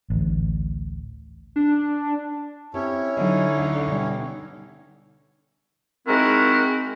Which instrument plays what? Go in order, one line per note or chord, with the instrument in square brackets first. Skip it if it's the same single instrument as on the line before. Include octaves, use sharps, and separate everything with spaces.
[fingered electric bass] A1 D2
[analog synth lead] D4
[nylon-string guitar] C4 G4 A4 [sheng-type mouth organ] C#4 E4 C#5
[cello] D3 D#4 [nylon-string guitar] F#3 D#5
[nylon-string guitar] D2
B2 G3
[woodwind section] G#3 C4 D#4 E4 F#4 A#4